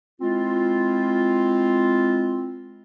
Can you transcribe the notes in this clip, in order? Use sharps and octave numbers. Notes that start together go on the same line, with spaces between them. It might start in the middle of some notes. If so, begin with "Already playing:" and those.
G#3 C4 E4 F4